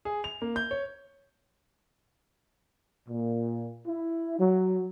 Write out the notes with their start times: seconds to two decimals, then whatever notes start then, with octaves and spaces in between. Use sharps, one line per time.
0.05 G#4
0.24 F7
0.42 A#3
0.56 G6
0.71 C#5
3.09 A#2
3.87 E4
4.39 F#3